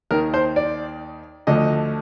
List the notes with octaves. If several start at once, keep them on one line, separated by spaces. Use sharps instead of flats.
D#2 D#3 A#4
C5
D5
D2 D3 F3 D#5